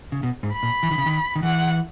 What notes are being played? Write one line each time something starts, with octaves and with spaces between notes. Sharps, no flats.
C#3
B2
G#2
B5
A#2
E3
D#3
C#3
D#3
D#3
E3 F#5